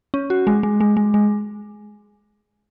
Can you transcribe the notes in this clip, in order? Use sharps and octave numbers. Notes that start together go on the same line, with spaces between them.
C#4
F#4
G#3
G#3
G#3
G#3
G#3